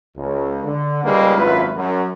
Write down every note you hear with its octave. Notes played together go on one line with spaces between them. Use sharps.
C#2
D3
C#2 G3 G#3 A#3 D#4 B4
G#1 F#2 E4 F4 B4
F#2